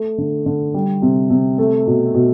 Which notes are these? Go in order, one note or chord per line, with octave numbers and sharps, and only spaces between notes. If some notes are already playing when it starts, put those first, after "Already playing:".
Already playing: A3
D3
D3
G3
C3
C3
A3
B2
B2